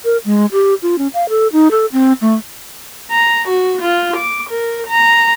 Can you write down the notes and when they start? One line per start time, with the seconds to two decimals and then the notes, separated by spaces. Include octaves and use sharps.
0.05 A#4
0.25 G#3
0.52 G4
0.82 F4
0.98 C#4
1.14 F5
1.29 A4
1.52 D#4
1.71 A4
1.92 C4
2.21 A3
3.11 A#5
3.48 F#4
3.82 F4
4.17 D6
4.50 A#4
4.87 A#5